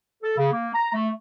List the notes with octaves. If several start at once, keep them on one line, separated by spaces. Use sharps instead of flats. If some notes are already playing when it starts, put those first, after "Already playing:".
A4
C#3
A#3
A#5
A3